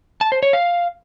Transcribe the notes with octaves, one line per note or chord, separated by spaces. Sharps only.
A5
C5
C#5
F5